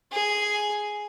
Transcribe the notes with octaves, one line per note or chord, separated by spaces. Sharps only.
G#4